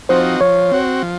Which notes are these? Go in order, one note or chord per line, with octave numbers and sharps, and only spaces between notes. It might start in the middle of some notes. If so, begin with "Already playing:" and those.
F3 C4 D#4 F#4 C5
F3 C#5
C4 F#4
F3